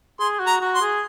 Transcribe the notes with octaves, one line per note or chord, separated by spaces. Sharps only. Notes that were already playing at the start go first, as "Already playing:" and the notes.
G#4 C6
F#4
A#5
F#4
C6
G#4